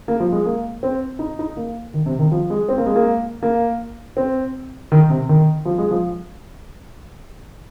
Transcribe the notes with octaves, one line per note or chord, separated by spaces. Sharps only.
A#3
F3
G#3
A#3
C4
D#4
D#4
A#3
D#3
C3
D#3
F3
G#3
C4
A#3
G#3
A#3
A#3
C4
D#3
C3
D#3
F3
G#3
F3